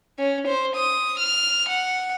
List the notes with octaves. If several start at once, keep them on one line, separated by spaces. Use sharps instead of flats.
C#4
C5
D#6
F6
F#5